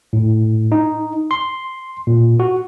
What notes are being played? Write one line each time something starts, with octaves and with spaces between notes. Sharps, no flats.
A2
D#4
C6
A#2
F#4